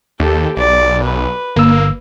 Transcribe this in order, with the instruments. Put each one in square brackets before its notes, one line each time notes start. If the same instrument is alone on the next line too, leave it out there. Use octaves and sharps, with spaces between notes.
[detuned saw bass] D#2 [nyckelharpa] G4 A4
[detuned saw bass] B1 [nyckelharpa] D5
[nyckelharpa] B4
[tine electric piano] G1 E6 [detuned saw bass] A#3